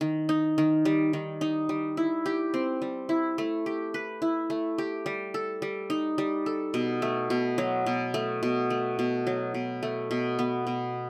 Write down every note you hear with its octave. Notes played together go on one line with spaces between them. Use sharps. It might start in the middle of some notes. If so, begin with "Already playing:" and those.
D#3
D#4
D#3
G3
D#3
D#4
G3
E4
G4
C4
G3
E4
A3
G4
B4
E4
A3
G4
G3
A4
G3
D#4
G3
A4
B2
A3
B2
F#3
B2
A3
B2
A3
B2
F#3
B2
A3
B2
B3
B2